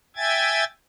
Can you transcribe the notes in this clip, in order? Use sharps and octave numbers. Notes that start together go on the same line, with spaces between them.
E5 G5 G#5 G#6 A6